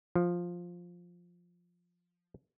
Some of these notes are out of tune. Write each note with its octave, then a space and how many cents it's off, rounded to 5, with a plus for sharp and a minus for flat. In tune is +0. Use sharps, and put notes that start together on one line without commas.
F3 +5